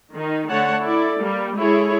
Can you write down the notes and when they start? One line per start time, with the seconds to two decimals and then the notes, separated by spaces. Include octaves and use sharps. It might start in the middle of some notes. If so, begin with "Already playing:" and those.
0.14 D#3 D#4
0.49 D3 A3 C#5 F#5 A5
0.84 E4 A4 D5
1.22 G3 A#3
1.58 G#3 E4 G#4 A4 C#5